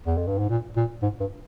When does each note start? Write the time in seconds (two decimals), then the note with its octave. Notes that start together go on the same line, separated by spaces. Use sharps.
0.07 E2
0.17 F2
0.28 G2
0.38 G#2
0.50 A#2
0.77 A#2
1.02 G#2
1.20 G2